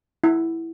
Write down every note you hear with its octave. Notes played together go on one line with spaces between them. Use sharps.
E4